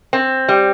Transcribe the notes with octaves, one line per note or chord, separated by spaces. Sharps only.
C4
G3